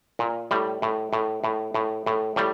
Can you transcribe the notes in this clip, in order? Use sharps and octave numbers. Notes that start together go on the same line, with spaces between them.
A#2
A2 G3
A2
A2
A2
A2
A2
A2 G3